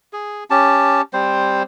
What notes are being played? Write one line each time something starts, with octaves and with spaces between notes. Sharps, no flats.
G#4
C#4 G4 A5
G3 C4 C5